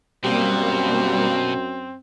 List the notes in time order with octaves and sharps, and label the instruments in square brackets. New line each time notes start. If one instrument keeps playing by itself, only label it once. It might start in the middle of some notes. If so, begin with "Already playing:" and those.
[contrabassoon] F#2 [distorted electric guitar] B2 [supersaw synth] G3 A#3 [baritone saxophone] C4